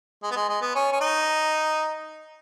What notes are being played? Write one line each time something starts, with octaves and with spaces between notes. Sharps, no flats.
G#3
B3
G#3
G#3
B3
C#4
C#4
D#4